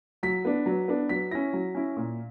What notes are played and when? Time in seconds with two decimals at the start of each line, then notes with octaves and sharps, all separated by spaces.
0.23 F#3 B6
0.45 B3 D4
0.66 F#3
0.88 B3 D4
1.09 F#3 B6
1.31 C#4 E4 A#6
1.53 F#3
1.75 C#4 E4
1.97 A#2